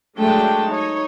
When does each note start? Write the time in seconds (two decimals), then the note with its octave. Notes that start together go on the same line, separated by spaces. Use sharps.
0.17 F#3 G#3 A3 D4 G5 A5
0.68 D#4 C#5